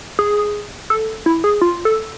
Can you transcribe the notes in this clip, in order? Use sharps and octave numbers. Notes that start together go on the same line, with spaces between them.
G#4
A4
E4
G#4
F4
A4